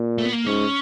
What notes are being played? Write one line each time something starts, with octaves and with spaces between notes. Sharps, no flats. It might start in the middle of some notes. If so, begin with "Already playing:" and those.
Already playing: A#2
A3
B3
A#3
G#2 C#4